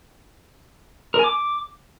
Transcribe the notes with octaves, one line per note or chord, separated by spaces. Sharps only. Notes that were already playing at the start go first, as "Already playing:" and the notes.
A#4
G#5
D6